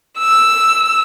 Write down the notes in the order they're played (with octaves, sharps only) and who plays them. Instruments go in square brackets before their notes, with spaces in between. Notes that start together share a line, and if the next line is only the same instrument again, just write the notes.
[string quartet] E6